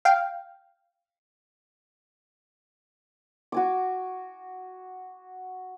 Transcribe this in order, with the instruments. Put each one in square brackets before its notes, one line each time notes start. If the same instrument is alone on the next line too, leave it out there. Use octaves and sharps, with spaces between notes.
[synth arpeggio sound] F5 G5
[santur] F#4 G#5 D6